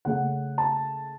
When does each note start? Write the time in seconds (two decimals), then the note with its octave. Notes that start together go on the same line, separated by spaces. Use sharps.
0.05 C#3 A3 C#4 F#5
0.58 A5